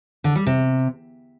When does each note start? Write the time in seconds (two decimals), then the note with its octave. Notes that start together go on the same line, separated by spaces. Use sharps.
0.24 D3
0.35 G3
0.46 C3